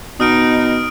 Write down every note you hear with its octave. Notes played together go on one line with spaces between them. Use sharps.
B2 D#4 D#6 F6 D7